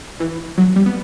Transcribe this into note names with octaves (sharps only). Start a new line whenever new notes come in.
E3
F#3
G3
B3